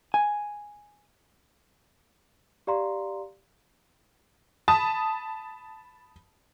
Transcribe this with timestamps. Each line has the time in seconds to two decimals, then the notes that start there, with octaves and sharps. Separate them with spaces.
0.14 G#5
2.67 G4 D5 F5 A#5 C6
4.68 A5 B5 D#6